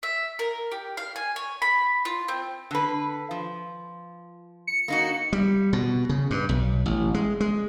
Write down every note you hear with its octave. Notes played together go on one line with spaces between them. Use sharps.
E5
A#4
G4
F5
G#5
C#5
B5
F4
C4
D3 B4
F3
C#7
A#3 D#4 F#4
G3
B2
C#3
G2
B1
A1
G#3
G#3